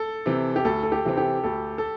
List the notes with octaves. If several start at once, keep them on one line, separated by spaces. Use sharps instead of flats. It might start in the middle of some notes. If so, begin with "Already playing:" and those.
Already playing: A4
C3 E3 C4
G4
D2 A4
A4
G4
C3 E3 C4
G4
D2 A4
A4